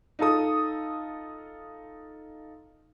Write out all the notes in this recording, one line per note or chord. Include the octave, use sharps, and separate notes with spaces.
D#4 F4 A4 D#6